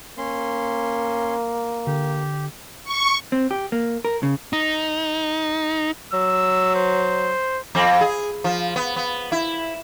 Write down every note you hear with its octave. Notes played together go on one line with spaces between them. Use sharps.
A#3 C#4 C6
D3 G4
C#6
C4
G4
A#3
A#4
C#3
D#4
F#3 E6
C5
F2 C4
G#4
F3
B3
B3
E4